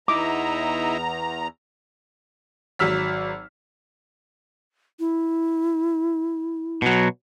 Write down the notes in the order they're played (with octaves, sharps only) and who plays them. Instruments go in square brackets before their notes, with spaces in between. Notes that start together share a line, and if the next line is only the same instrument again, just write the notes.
[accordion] E2 A#5 [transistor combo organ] D#4 E4 [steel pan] D6
[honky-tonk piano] G#1 F#3 E6 F6 B6
[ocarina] E4
[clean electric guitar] B2 F#3